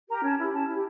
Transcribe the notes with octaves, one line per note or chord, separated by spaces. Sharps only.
G4 A#4 A#5
C#4 A5
E4 G4
C#4 A5
E4
G4